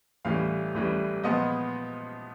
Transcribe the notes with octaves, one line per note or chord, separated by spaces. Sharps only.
A1 A2 E3 G3 F5
A1 A2 E3 G3
A#2 F3 G#3 B3 D#5